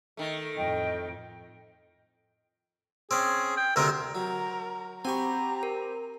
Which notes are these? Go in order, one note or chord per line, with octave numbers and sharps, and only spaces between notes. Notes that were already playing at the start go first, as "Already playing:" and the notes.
D#3 A3
F2 A2 D#5 G5
C4 C#4 G#4
G5
D2 C3 C4 A#4
F#3 A#4
C4 G4 F#5 G#5 A#5 B5 C#6
A#4